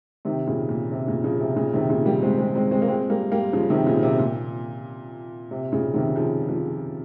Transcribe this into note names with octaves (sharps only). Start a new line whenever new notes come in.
C3 D#3
A#2 C#3
A#2
C3
A#2 C#3
C#3 F3
C3
A#2 C#3
C3 D#3
A#2 C#3
G3 A#3
G#3 C4
G#3 C4
G#3 C4
G#3 C4
A#3
G#3 C4
G3 A#3
G3 A#3
C#3 F3
C3 D#3
A#2 C#3
C3
A#2
C3
A#2 C#3
C3 D#3
C#3 F3
C#3 F3